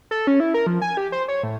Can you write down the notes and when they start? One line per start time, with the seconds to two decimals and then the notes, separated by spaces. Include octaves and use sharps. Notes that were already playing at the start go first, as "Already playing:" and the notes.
0.11 A4
0.27 C#4
0.40 E4
0.54 A#4
0.67 F3
0.82 G#5
0.97 G4
1.12 C5
1.28 C#5
1.43 A2